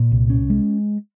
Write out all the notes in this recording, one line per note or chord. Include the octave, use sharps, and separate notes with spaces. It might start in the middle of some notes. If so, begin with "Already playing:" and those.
Already playing: A#2
C2
C#4
G#3